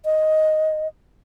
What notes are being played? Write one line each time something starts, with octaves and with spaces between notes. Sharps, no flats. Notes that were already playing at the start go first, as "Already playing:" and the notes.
D#5